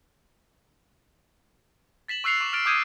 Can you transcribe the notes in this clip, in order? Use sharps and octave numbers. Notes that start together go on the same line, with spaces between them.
A6 B6 E7 F#7
C#6 E6 F#6 C7 C#7 F7
C#6 D6
F6 A6 D7 F7 F#7
D6 D#6 G6 G#6 D#7